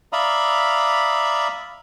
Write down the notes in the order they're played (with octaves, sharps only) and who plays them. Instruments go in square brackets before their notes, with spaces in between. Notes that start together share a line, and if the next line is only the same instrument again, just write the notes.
[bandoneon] D5 E5 F5 A#5 B5 D#6